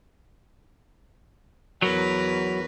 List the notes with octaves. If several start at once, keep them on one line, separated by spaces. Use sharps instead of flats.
E2 F#3 A#4 B4